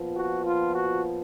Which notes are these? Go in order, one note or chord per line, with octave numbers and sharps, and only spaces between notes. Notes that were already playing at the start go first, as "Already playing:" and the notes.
Already playing: A#2 F3 B3
F#4
F4
F#4